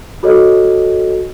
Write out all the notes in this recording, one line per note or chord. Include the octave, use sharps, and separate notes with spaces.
F#4 A4 C#5 D#5